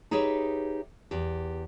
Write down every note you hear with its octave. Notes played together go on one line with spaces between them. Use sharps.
D#4 G4 G#4 B4 C#5 E5
E2 G4